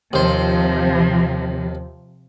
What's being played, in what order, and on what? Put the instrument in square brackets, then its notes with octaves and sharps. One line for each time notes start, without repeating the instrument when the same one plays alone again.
[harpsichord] D#2 C5 [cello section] C3 F3